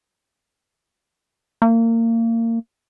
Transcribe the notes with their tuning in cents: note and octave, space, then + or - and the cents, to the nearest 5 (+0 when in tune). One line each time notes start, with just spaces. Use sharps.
A#3 -30